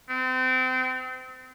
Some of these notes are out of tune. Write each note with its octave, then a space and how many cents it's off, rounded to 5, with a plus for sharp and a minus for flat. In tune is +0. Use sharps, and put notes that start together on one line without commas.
C4 -30